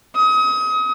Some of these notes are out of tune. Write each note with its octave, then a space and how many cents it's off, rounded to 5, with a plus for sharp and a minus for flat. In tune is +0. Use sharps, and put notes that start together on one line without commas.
D#6 +35